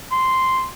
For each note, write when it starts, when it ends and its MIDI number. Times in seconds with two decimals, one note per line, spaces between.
0.12 0.67 84